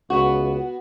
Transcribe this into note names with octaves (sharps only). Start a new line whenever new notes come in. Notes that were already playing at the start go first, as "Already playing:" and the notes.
C#2 B3 F#4